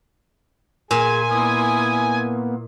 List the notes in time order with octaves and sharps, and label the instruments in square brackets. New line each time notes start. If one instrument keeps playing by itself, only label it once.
[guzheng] A#2 [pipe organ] G#4 [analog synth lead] G#5
[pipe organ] A#3 B3 [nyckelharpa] E4 D#6